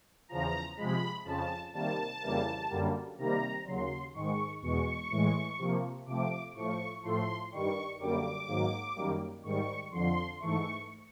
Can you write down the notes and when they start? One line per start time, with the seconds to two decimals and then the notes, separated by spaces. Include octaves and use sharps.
0.29 E2 C#3 F3 A#5
0.77 C3 F3 G#3 B5
1.25 F2 C#3 F3 A5
1.73 C3 D#3 G3 A#3 A5
2.22 F2 C#3 E3 G3 A#3
2.70 F#2 D3 G3 A#3
3.18 C3 D#3 G3 A#3 A#5
3.66 D#2 C#3 F#3 C6
4.14 G#2 D#3 G#3 C#6
4.62 E2 B2 G#3 C#6
5.10 A2 E3 G#3
5.58 C3 F3 A#3
6.06 C3 F3 A3 D6
6.54 A2 F3 A3 C#6
7.03 A2 F3 A3 C6
7.52 G2 D#3 G3 C#6
7.99 F#2 D3 G3 A#3 D6
8.48 G#2 D#3 F#3 A#3
8.95 F#2 D#3 G3 A#3
9.43 G#2 D#3 G3 C#6
9.91 F2 D3 F3 C6
10.40 G#2 E3 A3 C#6